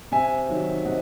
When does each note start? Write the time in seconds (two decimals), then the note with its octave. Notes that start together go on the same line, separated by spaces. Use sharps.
0.12 C3 E5 G#5
0.49 D#3 F#3
0.85 C3 D#5 F#5